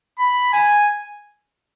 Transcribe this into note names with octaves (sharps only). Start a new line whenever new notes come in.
B5
G#5